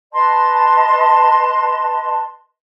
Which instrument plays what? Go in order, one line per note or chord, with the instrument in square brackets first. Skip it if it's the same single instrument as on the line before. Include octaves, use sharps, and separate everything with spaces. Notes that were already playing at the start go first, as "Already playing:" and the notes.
[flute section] B4 D#5 A5 C6